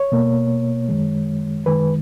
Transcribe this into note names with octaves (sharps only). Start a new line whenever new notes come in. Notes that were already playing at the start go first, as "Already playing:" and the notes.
Already playing: C#5
B2 A#3
F#2 D#3 G#3
F#2 D#3 G#3 B4